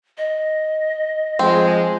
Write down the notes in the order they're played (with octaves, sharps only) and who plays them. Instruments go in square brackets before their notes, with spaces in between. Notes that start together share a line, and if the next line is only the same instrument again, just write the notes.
[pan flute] D#5
[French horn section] F3 G#3 [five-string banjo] C4